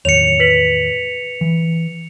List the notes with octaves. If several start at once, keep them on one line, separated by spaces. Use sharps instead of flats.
E2 A2 D#3 C#5 C#7 F7
B4 B6 F#7
E3